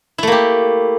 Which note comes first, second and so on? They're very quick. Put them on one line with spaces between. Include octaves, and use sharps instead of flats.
E4 A3 A#3 G4